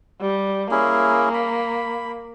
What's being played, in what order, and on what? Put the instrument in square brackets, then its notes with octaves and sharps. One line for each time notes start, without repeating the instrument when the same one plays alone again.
[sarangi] G3
[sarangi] A#3 [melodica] C#4 E4 G#4
[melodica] B5